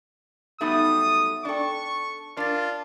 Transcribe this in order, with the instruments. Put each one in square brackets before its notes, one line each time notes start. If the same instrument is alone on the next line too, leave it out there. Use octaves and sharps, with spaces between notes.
[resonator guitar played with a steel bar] F#3 G3 A3 [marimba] B3 D#4 [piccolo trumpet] D#6
[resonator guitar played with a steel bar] D4 A4 [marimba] D5 G5 [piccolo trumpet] C#6
[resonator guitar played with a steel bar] D4 [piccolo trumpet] F4 [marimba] A#4 F5 A6